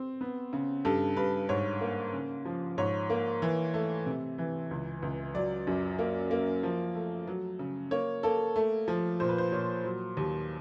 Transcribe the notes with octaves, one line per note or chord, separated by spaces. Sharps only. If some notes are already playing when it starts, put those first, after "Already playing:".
Already playing: C4
B3
C#3
G2 A4
G2 B4
G#2 C#5
A#3
C#3
F3
G#2 C#5
A#3
E3
A3
C3
E3
C#2
C#2
F#3 D5
F#2
A#3
A#3
F3
A3
F#3
C#3
A#3 C#5
A#3 A4
A3
F3
A#2 C5
B4
C5
A#2 C#5
F#3
D#2